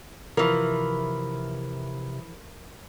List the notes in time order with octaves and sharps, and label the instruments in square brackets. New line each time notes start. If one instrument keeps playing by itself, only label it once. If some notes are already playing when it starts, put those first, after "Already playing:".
[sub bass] C3 [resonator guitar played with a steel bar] E3 F3 [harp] A#4